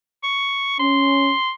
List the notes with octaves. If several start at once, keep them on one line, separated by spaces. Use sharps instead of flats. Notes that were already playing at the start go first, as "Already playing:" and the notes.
C#6
C#4 C6